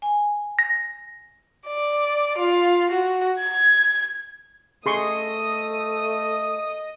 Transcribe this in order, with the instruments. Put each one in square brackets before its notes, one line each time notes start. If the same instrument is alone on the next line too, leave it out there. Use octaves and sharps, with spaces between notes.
[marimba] G#5
[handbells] A#6
[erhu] D5
F4
F#4
G#6
[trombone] A3 [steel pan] G#4 C6 C#6 [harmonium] D#5 [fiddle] D#6